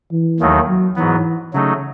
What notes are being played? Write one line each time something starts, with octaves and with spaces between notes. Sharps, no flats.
E3
D#2 D#3 F#3 A3 D#4
F#3
G#2 E3 F#3 B3
C#3 F#3 A3 D#4